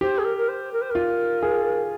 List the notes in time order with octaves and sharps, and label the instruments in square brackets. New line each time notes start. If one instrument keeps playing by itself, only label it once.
[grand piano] G4 [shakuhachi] C5
[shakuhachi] G#4
A#4
A#4
C5
A#4
C5
[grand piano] F4 [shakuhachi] A#4
[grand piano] G#4